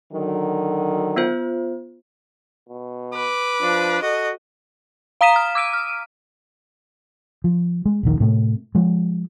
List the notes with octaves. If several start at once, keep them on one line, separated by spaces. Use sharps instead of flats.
D3 D#3 F#3
B3 F4 C5
B2
B4 D6
F3 D4
F#4 A4 D#5
F5 A#5 D#6 B6 D#7 E7
F6
D6 E6 D7 D#7
F6
F3
G#3
D#1 A#1 D#3
A2 C3 A3
F3 G#3